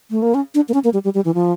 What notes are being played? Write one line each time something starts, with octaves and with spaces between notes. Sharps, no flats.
A3
A#3
C#4
D4
A#3
C#4
A#3
G3
G3
G3
E3
F3